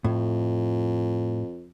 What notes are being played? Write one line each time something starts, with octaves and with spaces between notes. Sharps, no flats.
F2 A2